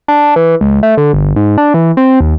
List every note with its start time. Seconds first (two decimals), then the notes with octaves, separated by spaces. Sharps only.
0.08 D4
0.36 E3
0.61 C#2
0.83 A3
0.97 D3
1.13 G1
1.36 G#2
1.58 D4
1.74 E3
1.97 C4
2.21 D#2